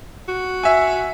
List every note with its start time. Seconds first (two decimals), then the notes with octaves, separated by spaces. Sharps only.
0.28 F#4
0.63 E5 G#5